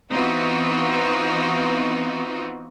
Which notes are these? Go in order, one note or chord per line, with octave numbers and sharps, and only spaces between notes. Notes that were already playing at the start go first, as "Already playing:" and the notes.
E3 B3 C4 D#4 F4 F#4